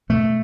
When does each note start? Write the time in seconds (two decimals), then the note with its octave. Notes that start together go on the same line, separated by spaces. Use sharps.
0.09 B2 A3